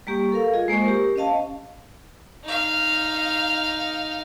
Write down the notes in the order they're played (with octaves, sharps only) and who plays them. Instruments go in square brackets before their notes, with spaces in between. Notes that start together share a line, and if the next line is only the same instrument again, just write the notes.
[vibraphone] G3 A#3 G4 C#6
A4 A#4 F5
F4 G#4 D#5
G#3 A#3 C5 C#6
G4 A#4
C#4 C5 D#5 F5 A5
[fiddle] D#4 F5